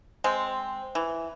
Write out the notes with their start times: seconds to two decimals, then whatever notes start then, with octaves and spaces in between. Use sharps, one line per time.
0.24 G#3 C4
0.95 E3